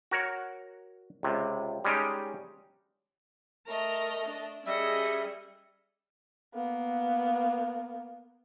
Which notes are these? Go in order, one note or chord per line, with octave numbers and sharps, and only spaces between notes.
F#4 A#4 C#5 F#5
C#2 C3
G3 G#3 C#4 D#4 G4
A3 A#4 D#5 A#5
D4
G3 C#4 G#4 D#5 E5 C#7
A#3 B3